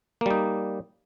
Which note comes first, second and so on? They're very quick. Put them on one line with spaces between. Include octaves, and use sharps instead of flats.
A#3 G3 D#4